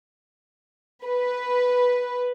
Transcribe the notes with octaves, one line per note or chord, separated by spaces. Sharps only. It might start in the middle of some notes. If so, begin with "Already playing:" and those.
B4